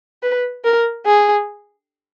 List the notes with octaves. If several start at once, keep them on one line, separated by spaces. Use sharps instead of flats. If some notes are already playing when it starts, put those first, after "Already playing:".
B4
A#4
G#4